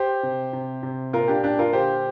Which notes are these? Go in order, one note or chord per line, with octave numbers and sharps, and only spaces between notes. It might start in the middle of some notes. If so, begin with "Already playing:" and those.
Already playing: G4 C5
C3
C3
C3
A#2 F4 A#4
D4 G4
A#2 D4 G4
F4 A#4
D3 G4 C5